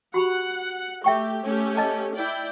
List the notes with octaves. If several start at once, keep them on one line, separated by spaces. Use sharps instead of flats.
F#4 G4 F#5 B5
A3 G4 E5 G5 C#6
A3 C#4 G4
D#5 A5
E4 D5 G5